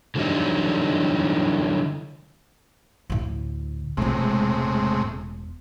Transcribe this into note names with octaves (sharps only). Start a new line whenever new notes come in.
D3 E3 F#3 G3 D#4
D2 A2
E1 A2 C3 G#3 F4